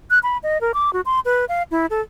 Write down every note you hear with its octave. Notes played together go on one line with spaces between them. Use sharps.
F#6
B5
D#5
A#4
D6
F#4
C6
B4
F5
E4
A4